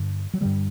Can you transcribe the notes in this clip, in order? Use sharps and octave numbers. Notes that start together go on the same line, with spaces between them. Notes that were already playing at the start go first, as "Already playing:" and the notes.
Already playing: G2 D3
F#3
G2 D3 G3